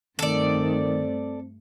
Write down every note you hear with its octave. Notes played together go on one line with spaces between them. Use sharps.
G2 D#3 A3 C4 A4 D5